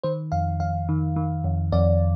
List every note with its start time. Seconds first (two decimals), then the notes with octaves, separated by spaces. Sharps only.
0.04 D#3 C5
0.32 F2 F5
0.60 F2 F5
0.89 D#3
1.16 D#3
1.44 F2
1.72 F2 D5